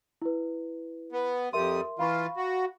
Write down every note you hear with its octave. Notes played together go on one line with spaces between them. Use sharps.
E4 B4
B3
F2 G3 A#4 E5 C6 D#6
E3 F4 F5 B5 C#6
F#4